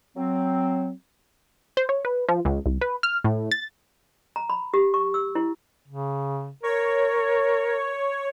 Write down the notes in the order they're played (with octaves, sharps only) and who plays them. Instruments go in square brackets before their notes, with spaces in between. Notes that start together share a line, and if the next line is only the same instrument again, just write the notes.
[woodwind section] F#3 C4
[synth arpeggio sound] C5
C#5
B4
F3
C#2
C2
B4
F6
A2
A6
[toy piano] A#5
B5
G4
C#6
E6
E4
[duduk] C#3
[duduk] A#4 [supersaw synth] C#5